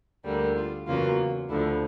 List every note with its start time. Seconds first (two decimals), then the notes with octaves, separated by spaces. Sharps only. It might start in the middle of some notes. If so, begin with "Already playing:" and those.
0.25 D2 D3 G3 A#3
0.56 F4
0.87 E2 C#3 F#3 A#3 F4
1.49 D2 D3 F3 E4